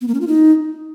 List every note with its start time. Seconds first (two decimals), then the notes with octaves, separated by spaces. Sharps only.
0.01 B3
0.08 A#3
0.14 C#4
0.21 F4
0.27 D#4